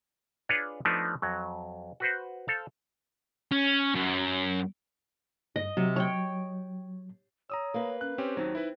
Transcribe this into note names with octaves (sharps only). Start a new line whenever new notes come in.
D4 F4 G#4 B4 C#5
F3 A3 B3 D4 D#4
F2 F#3
F#4 B4 C5
A4 C5 F5
C#4
F#2
G2 D#5
C3 F#3
C#5 G5
C#5 A#5 D#6 E6
A#3 B4
C#4 F#6
C4 C#4 G4 B4
D#2 F#3 C4 D#4
E4 B4